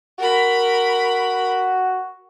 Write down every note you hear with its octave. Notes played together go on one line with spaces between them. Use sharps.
F#4 A#4 B5